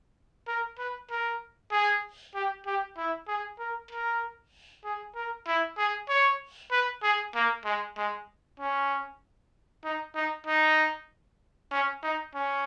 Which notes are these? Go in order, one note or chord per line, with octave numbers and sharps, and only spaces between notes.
A#4
B4
A#4
G#4
G4
G4
E4
G#4
A#4
A#4
G#4
A#4
E4
G#4
C#5
B4
G#4
A#3
G#3
G#3
C#4
D#4
D#4
D#4
C#4
D#4
C#4